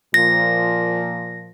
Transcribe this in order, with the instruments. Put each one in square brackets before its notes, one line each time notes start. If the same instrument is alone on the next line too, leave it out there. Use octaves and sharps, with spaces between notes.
[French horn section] A#2 F3 [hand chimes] A#6